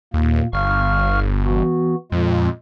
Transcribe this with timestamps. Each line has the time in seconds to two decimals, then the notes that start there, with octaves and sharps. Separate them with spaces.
0.14 D#2 A#2 A#3
0.53 G1 F5 C#6 F6
1.45 E3 B3 F#4
2.12 F2 A#2 G#3 F4